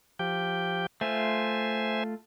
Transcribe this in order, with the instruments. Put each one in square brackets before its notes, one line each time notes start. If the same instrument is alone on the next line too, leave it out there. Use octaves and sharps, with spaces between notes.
[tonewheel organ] F3 G4 G5
[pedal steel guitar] A3 F4 [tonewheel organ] C5 E5 G#5